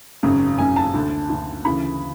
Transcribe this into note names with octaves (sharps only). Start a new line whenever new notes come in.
G#1 F#2 C#3
G#1 F#2 C#3 G#5
A5
D2 D3
D2 D3
D2 C#3 E3 B5